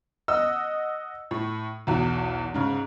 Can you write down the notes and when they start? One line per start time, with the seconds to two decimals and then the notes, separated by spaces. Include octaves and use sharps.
0.28 D#5 F#5 E6
1.31 A2
1.87 B1 E2 F#4
2.54 G#2 C#3